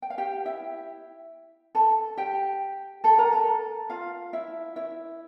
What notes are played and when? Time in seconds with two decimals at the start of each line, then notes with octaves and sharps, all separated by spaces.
0.02 G5
0.10 F5
0.18 G4 G5
0.45 E4 E5
1.75 A4 A5
2.17 G4 G5
3.04 A4 A5
3.18 A#4 A#5
3.32 A4 A5
3.90 F4 F5
4.33 E4 E5
4.76 E4 E5